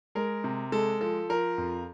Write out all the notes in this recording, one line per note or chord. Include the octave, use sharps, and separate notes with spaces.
G#3 A#4
C3
G#3 A4
F3 A4
F3 A#4
F2